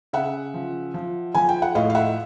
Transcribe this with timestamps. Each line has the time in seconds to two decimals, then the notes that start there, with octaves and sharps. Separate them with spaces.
0.13 C#3 E5 F#5
0.54 F3
0.94 F3
1.34 F3 G#5
1.49 G5
1.62 F#5
1.75 A2 D#5 F5
1.90 F5
1.95 E5 F#5